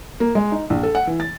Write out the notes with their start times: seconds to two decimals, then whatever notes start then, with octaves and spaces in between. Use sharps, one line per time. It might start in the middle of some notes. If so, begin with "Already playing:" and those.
0.20 A#3
0.35 G#3
0.52 D#4
0.70 A#1
0.83 A4
0.95 F#5
1.07 E3
1.20 A6